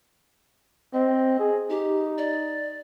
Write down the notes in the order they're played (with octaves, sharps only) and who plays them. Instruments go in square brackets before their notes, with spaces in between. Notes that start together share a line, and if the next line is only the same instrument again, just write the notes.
[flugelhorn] C4 [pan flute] D#5
[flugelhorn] G#4
[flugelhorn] D#4 [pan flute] G4
[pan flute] D5